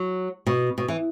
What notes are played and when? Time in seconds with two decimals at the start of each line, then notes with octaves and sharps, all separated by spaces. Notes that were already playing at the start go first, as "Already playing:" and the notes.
Already playing: F#3
0.47 B2
0.78 B2
0.88 E3